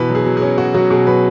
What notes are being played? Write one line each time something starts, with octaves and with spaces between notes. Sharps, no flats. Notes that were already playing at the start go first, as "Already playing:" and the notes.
Already playing: B2 E3 B4
F#3
G#4
F#3
G#4
C#4
C#4 F#4
F#3 F#4
B2 G#4
F#3 B4